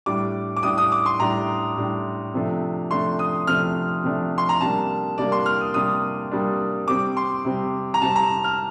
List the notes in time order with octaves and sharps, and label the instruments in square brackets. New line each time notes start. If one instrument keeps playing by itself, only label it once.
[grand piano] A2 G3 D4 D6
D6
A2 G3 D4 D#6
D#6
D6
C6
A2 G3 D4 A#5
A2 G3 D4
C3 F3 A3 D4
C3 F3 A3 D4 C6
D#6
C3 F3 A3 D4 F6
C3 F3 A3 D4
C6
A#5
C3 G3 A#3 D4 A5
C3 G3 A#3 D4 D5
C6
F6
D#6
C3 G3 A#3 D4 D#6
C3 G3 A#3 D4
C3 G3 C4 D6
C6
C3 G3 C4
A#5
C3 G3 C4 A5
A#5
F6